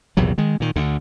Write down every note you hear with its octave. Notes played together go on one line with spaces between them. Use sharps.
A#1 E2 C3 F#3
D#3 G#3
A#2 D#3
D2 D3